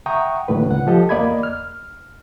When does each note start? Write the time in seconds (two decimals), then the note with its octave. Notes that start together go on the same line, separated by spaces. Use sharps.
0.06 E5 F#5 G5 A#5 C#6 D#6
0.48 D#2 A2 D3 B4
0.66 C#2 F#5
0.87 F3 G4 A4 D#5
1.09 E2 A#3 D5 D#5 B5 G#6
1.43 F6